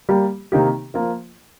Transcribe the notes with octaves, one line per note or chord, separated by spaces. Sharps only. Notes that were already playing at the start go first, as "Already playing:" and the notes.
G3 A#3 G4
C3 D#3 A#3 D#4 G4
F3 A#3 F4